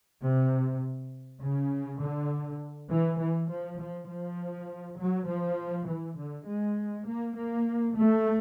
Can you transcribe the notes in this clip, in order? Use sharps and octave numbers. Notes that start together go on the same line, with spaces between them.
C3
C#3
D3
E3
E3
F3
F3
F3
F#3
F3
E3
D3
G#3
A#3
A#3
A3